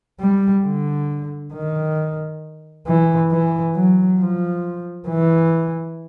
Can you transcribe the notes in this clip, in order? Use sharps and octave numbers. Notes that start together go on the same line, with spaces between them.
G3
D3
D#3
E3
E3
F#3
F3
E3